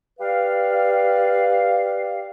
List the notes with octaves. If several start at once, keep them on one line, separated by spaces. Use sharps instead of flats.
G4 B4 D5 F5